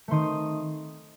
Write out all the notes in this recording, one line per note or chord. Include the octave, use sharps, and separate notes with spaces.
D#3 A3 C4 C6 D#6